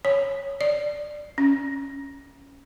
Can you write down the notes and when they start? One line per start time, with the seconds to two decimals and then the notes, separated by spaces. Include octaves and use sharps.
0.05 C#5
0.61 D5
1.38 C#4